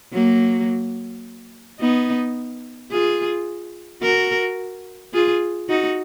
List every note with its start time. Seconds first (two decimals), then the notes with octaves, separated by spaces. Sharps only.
0.13 F#3 A#3
1.80 B3 D#4
2.91 F4 G#4
4.02 F#4 A#4
5.13 F4 G#4
5.69 D#4 F#4